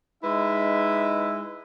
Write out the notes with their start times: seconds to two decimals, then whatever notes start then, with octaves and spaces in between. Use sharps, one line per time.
0.22 G#3 D#4 E4 B4 E5